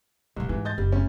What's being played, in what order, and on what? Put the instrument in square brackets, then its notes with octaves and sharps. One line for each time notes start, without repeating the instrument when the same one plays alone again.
[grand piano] C2 [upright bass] G2 B2
[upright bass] G#2 [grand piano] E3
[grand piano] D#5 G6 A6
[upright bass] F#1 [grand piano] G3
[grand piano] D2 C#4